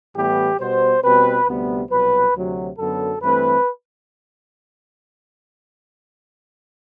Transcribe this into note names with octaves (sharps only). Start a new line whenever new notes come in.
A2 E3 G3 B3 G4
B2 G3 B3 C5
B2 G3 C4 B4
D2 C3 G3 B3
C2 B2 F#3 B4
D2 C3 F#3
F#2 D3 F#3 B3 A4
G2 E3 A3 C4 B4